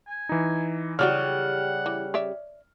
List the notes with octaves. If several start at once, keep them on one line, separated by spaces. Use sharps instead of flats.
G#5
E3 D#4
C#3 E3 F#3 G3 F#4 G4 F#5 F6
E3
C#5 D5 E5